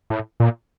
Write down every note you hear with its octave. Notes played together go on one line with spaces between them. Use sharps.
A2
A#2